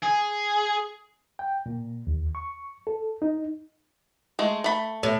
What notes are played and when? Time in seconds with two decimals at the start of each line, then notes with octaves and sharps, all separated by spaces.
0.03 G#4
1.39 G5
1.66 A#2
2.07 D#2
2.35 C#6
2.87 A4
3.22 D#4
4.39 G#3 A3
4.64 A3 B5
5.03 A2